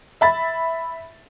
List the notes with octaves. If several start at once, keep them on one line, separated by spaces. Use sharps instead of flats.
E5 B5 A6